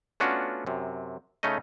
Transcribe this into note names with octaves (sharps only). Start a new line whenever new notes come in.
A3 B3 C#4 D4 F4 F#4
F#2 C3
C#3 A3 C#4 D#4 D#5